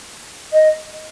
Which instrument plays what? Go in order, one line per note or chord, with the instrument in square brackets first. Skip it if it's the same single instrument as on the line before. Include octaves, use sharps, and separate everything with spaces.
[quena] D#5